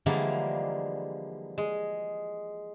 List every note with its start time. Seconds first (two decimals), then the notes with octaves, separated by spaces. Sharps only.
0.06 D3 E3 F3 G3 G#3 A#3
1.58 G#3